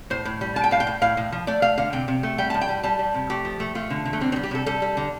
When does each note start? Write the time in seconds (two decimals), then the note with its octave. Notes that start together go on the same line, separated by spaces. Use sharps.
0.10 A2 C5
0.25 A2
0.41 G3
0.56 A2 A5
0.64 G5
0.71 A2 F5
0.80 G5
0.87 A2
1.02 A2 F5
1.17 A2
1.32 F3
1.47 A3 D5
1.62 A3 F5
1.78 D3 F5
1.93 C3 G5
2.08 C3
2.23 A3
2.38 G3 G5
2.50 A2 A5
2.61 G5
2.69 G3
2.83 G3 A5
2.99 G3
3.14 C3
3.30 A3 G4
3.45 F3
3.60 A3
3.75 A3 F4
3.90 D3
4.05 D3
4.13 A3
4.21 G3 C4
4.32 C4
4.36 G3
4.43 G4
4.51 C3 A4
4.66 G3 A4
4.82 G3
4.97 D3